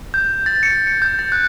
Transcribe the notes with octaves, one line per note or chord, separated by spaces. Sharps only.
G6
A6
C#7
C#7
G6
A6
F#6